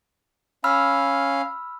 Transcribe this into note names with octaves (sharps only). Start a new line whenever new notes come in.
C#4 F5 B5 E6 F6